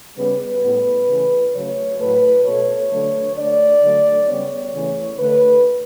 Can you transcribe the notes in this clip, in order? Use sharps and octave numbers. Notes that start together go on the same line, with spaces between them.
C#3 G3 B3 B4
A2 G3 B3
C#3 E3 A3
C#3 F#3 A3 C#5
A2 F#3 A3 B4
B2 A3 C#5
D3 F#3 A3
D3 A3 D5
D3 F#3 A3
C#3 G3 B3 C#5
C#3 E3 A3
D3 A3 B4